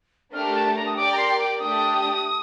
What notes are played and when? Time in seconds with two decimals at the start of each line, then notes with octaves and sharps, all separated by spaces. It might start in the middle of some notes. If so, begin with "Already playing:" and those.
0.33 A3 D4 G4 A#4 F6
0.55 A5
0.75 A#5
0.86 D#6
0.96 G4 A#4 D5 G5 D6
1.12 A#5
1.18 C6
1.39 D6
1.59 A3 D4 G4 D5 G5 D#6